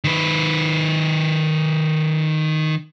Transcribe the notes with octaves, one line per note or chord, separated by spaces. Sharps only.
D#3 B4